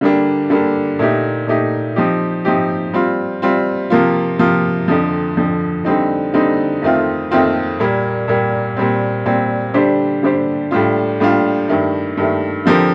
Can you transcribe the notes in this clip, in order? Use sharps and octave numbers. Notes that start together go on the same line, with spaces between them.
D3 G3 A#3 D4
D3 G3 A#3 D4
A#2 A3 D#4 G4
A#2 A3 D#4 G4
F3 C4 D#4 G4
F3 C4 D#4 G4
G3 C4 F4
G3 C4 F4
C3 F3 A#3 F4
C3 F3 A#3 F4
F2 D3 F3
F2 D3 F3
D3 G3 C4 D#4
D3 G3 C4 D#4
F2 D#3 A3 C4 F4
F2 D#3 A3 C4 F4
A#2 G3 A#3
A#2 G3 A#3
A#2 G3 C4
A#2 G3 C4
D3 G3 D4 G4 C5
D3 G3 D4 G4 C5
A2 G3 D4 F4
A2 G3 D4 F4
G2 D#3 A3
G2 D#3 A3
D3 F3 C4 G4 A#4